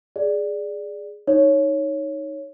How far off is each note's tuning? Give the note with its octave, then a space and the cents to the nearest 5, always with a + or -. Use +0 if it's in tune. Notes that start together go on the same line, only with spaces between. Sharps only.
G#4 +0 D5 +0
D#4 +0 C#5 +0